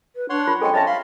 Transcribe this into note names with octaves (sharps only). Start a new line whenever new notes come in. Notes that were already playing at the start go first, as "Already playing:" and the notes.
B4
D4 C#5 F#5 C6
F4
G#3 C4 C#4 A4 G5 G#5
C4 C#4 C#5 D#5 E5 A5
F5 B5 C6